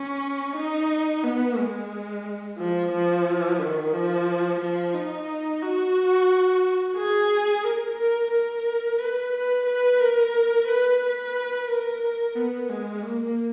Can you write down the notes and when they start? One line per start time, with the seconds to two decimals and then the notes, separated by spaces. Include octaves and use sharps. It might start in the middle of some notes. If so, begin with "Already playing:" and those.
Already playing: C#4
0.56 D#4
1.24 B3
1.58 G#3
2.58 F3
2.92 F3
3.59 D#3
3.93 F3
4.60 F3
4.94 D#4
5.62 F#4
6.96 G#4
7.64 A#4
7.97 A#4
8.31 A#4
8.98 B4
9.32 B4
9.66 B4
10.00 A#4
10.67 B4
11.01 B4
11.68 A#4
12.36 B3
12.69 G#3
13.03 A#3